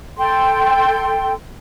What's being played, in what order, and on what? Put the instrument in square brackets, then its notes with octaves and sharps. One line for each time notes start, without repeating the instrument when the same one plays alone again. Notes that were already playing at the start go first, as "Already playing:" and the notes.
[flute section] A4 G5 C6